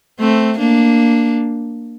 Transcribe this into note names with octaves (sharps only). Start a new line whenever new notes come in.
A3 C4
A#3 D4